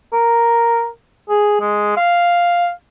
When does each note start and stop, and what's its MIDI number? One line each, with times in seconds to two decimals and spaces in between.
0.13 0.88 70
1.29 1.56 68
1.61 1.93 56
1.97 2.69 77